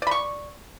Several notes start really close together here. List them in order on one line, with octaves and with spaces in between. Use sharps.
D5 B5 C#6